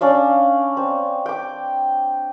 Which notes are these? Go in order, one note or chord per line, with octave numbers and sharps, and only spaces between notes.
C#4 D4 D5 F5
C4
G5 D6